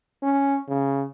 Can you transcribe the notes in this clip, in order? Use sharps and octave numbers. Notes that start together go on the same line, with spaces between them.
C#4
C#3